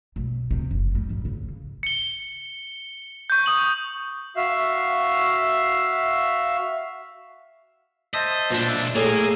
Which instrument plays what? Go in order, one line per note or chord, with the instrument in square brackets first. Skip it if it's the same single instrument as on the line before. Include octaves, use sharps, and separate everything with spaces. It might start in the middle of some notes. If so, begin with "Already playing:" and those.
[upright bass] B1
D2 C3
F#1 F#3
G3
G#2
C#3
[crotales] C#7 G7
C#6 G6
C#6 D#6 F#7
[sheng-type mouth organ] F#4 E5 F5
[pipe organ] C5 E5 A5 [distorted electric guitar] D#5
[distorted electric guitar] B1 D4 [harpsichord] A#2
[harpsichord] A2 [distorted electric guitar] A#3 [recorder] G#4 [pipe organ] E6